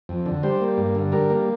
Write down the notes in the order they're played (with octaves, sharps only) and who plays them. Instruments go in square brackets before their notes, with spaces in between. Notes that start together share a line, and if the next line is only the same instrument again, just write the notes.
[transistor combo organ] F2
D3
G3 C5
A#3
G2
D3
G3 A#4
A#3